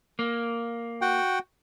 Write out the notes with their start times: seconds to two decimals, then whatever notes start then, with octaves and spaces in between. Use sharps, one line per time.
0.19 A#3
1.02 F#4 F#5 G5